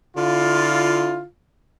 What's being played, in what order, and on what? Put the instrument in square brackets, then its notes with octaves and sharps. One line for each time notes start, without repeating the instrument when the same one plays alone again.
[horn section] D3 E4 F4